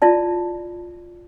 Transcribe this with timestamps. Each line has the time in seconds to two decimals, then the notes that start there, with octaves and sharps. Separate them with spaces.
0.02 E4 F4 D5 A5